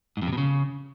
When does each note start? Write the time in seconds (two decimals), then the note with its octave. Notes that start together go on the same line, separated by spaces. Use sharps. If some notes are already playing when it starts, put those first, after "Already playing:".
0.17 G#2
0.22 F2
0.27 C3
0.33 B2
0.38 C#3